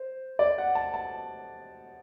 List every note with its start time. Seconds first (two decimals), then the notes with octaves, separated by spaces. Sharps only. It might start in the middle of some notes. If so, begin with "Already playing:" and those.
Already playing: C5
0.39 D5
0.58 F#5
0.75 A5
0.94 A5